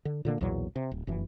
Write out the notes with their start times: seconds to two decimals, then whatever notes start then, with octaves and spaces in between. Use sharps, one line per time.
0.05 D3
0.25 A#2 D3 F3 A#3
0.41 B1 E2 A#2 F#3
0.76 C3
0.92 D1
1.07 F1 F#2 E3